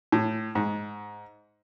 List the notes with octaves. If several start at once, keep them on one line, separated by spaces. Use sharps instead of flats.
A2
G#2